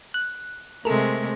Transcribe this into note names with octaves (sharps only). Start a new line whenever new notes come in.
F#6
C3 G#3 A3 A4 A#4